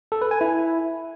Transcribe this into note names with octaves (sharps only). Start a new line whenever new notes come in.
A4
B4
G#5
E4